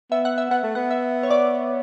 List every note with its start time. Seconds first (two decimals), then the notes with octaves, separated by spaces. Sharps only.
0.11 B3 E5
0.25 F#5
0.38 E5
0.51 B3 F#5
0.63 A3
0.75 B3 F#5
0.91 E5
1.23 C#5
1.30 D5